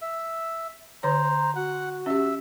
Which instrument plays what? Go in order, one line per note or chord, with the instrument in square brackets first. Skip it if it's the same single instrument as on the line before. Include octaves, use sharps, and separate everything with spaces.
[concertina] E5
[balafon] D3 C#5 [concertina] C5 [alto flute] A#5
[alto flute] F#4 [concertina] F#5
[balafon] C#4 G4 [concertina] E5